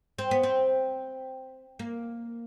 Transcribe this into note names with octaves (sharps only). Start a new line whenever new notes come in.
C4
B3
C4
A#3